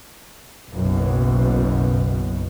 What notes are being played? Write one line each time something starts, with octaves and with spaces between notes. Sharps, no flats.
F#1 B1 F#2 B2